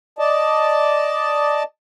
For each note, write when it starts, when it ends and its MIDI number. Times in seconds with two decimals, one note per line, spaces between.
0.19 1.63 74
0.19 1.63 75
0.19 1.63 81